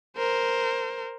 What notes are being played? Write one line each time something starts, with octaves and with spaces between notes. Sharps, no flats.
A#4 C5